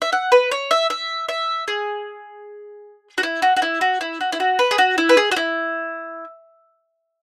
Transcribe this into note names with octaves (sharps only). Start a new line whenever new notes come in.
E5
F#5
B4
C#5
E5
E5
E5
G#4
F#4
E4
F#4
F#4
E4
F#4
E4
F#4
E4
F#4
B4
G#4
F#4
E4
B4
G#4
F#4
E4